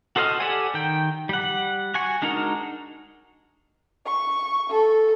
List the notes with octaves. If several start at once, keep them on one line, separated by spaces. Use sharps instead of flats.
F#4 A4 C5 D#5 F6
G4 A4 D5 F#5 G#5
D#3 G5
G3 F#5
F#4 G#5 C#6
G#3 D4 D#4 F#4 A#4
C#6
A4